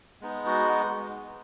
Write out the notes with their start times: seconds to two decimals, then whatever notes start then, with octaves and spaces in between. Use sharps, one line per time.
0.21 G#3 B3 D#4
0.46 F#4